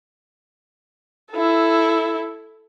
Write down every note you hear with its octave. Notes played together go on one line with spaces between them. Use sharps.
E4 A4